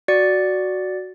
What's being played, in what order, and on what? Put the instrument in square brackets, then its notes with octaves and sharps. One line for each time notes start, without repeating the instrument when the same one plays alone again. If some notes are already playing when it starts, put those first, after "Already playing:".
[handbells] F#4 D5 C#7